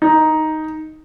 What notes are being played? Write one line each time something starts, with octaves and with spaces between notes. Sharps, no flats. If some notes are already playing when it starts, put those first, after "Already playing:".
D#4